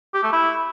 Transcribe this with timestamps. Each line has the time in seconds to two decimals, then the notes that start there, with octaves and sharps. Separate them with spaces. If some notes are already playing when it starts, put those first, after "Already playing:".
0.14 G4
0.23 A3
0.32 E4